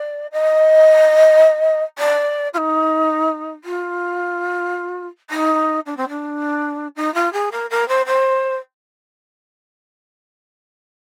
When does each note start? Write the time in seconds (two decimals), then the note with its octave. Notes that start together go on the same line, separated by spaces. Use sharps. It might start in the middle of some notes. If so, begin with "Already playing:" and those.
Already playing: D5
0.32 D#5
1.98 D5
2.53 F4
2.57 D#4
3.64 F4
5.30 D#4
5.86 D4
5.97 C4
6.09 D4
6.96 D#4
7.14 F4
7.33 G#4
7.51 A#4
7.70 A#4
7.88 C5
8.06 C5